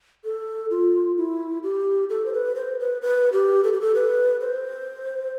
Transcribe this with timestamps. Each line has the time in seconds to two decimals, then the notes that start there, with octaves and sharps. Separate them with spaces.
0.24 A4
0.70 F4
1.17 E4
1.63 G4
2.10 A4
2.26 C5
2.33 B4
2.56 C5
2.80 B4
3.02 B4
3.33 G4
3.64 A4
3.73 G4
3.81 A4
3.95 B4
4.41 C5